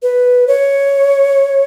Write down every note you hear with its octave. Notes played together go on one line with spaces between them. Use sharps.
B4
C#5